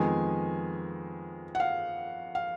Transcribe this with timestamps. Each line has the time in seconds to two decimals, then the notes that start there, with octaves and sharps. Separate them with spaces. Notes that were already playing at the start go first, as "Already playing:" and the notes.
Already playing: F2 D#3 G#3 B3 G#5
1.55 F#5
1.60 F5
2.35 F5